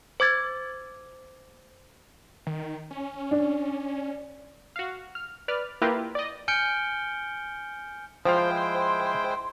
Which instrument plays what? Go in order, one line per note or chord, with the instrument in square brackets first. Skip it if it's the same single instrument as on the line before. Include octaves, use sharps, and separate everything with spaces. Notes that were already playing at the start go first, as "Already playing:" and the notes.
[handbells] C5 D6 G#6 A6
[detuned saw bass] D#3
C#4
[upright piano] D4
[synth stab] F#4 F5
F6
B4 D5 F6
A#3 E4 F4 G4 A#4 B4
D5 D#5
[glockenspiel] G#5 F6 G6 C#7 D7 G7
[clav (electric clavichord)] F3 F5 [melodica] G#3 E4 [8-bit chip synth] C5 G5 [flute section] C6